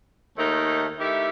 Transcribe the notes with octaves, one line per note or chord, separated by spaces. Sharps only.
D#2 D#3 A3 D#4
D#3 A3 E4 G4